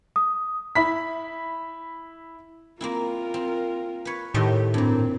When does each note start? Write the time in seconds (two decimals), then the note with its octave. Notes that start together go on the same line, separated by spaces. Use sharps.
0.16 D#6
0.75 E4 B5 B6
2.81 A#3 C4 E4 F4 A#4
3.34 C4
4.05 B4 C#5
4.34 A2 D#3 G4 C5 D#5
4.74 G2 A#2 C4